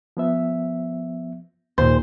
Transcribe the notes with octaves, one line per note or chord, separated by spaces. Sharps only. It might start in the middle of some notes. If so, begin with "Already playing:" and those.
F3 B3 E5
D#2 A#2 C5